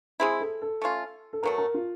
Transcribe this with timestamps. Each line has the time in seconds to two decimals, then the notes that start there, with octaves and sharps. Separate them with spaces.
0.20 G#3 C4 E4 G#4
0.40 A4
0.62 A4
0.82 A3 C#4 F4
1.33 A4
1.43 B2 F#3 A3 A#4
1.58 A#4
1.74 F4